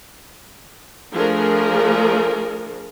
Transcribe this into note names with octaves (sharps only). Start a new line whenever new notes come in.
F3 A3 D4 G#4 A#4